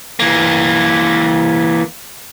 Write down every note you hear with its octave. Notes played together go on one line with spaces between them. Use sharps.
E3 A#3